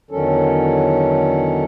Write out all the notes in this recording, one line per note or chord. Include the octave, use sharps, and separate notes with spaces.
E2 D3 D#3 F#3 C#4 A4